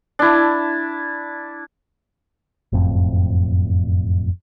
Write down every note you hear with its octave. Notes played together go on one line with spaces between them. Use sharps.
D4 E4
F#1 F2 A2 C4